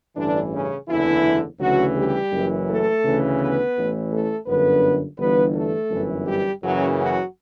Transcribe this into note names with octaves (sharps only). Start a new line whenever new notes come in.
A1 G2 D3 E3 D4
C#3 C#4
F#1 E2 D3 E3 E4
D2 C#3 E3 F#3 F#4
G3 G4
F#1 F#2 E3
A3 A4
D2 C#3 E3
B3 B4
A1 A2 E3
A3 A4
G1 F#2 D3 B3 B4
G1 G2 E3 B3 B4
A3 A4
G1 F#2 E3
G3 G4
F#1 F#2 C#3 E3 F#3 F#4
F#3 F#4